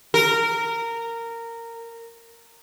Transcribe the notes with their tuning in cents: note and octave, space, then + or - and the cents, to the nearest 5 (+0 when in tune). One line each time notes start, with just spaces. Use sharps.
A#4 -15